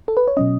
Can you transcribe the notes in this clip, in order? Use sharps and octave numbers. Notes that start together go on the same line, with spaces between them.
A4
B4
C#5
B2 F#3 C#4 D#5